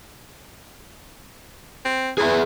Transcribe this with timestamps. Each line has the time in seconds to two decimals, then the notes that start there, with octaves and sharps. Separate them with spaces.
1.85 C4
2.18 E3 G#4 B4 E5